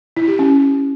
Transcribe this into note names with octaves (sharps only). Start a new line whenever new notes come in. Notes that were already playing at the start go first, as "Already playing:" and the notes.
E4
G4
C#4